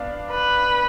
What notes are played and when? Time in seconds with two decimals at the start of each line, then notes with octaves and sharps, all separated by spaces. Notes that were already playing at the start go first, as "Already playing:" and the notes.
Already playing: B3 D4 D5 F5
0.31 B4